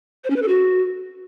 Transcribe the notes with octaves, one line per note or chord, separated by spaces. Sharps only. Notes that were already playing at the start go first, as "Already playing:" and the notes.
C5
C#4
B4
A4
F#4